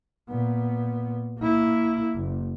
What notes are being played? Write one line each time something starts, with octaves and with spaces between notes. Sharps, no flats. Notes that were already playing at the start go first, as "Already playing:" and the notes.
A#2 B3
A#3 E4
F#1